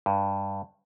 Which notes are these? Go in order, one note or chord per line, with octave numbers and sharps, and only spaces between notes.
G2